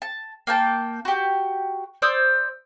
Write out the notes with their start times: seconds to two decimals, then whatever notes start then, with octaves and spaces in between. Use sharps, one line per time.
0.02 A5
0.47 A#3 G5 A5
1.05 F#4 G4
2.02 C5 D5 D#6 E6